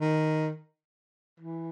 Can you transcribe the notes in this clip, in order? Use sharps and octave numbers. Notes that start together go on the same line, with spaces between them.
D#3
E3